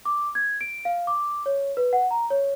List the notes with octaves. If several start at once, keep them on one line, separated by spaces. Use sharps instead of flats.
D6
G#6
D7
F5
D6
C#5
B4
F#5
A#5
C#5